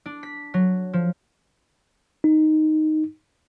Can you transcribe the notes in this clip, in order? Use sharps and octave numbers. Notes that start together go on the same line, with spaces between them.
D4
B6
F#3
F3
D#4